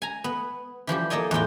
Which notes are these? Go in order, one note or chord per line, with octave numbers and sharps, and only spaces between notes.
G#5 A#5
B3
E3 F3 G3 G4
A#3 A4 D5 D#5 G#5
E2 A2 F4 G5